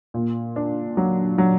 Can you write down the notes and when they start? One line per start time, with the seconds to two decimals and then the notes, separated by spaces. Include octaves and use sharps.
0.14 A#2
0.56 D4
0.97 F#3
1.38 F#3